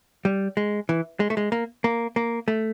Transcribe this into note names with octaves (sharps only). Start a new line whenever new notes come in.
G3
G#3
E3
G#3
A3
G#3
A#3
A#3
A#3
A3